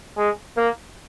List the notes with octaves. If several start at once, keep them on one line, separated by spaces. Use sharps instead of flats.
G#3
A#3